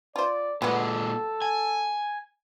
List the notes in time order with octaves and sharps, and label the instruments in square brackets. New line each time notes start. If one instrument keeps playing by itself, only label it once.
[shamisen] F4 C5 [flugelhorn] D5
[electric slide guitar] A#2 G#3 [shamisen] F#3 B3 [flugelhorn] A4
[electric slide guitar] G#5